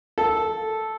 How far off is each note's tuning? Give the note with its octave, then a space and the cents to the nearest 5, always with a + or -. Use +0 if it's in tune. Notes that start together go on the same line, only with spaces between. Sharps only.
A4 -5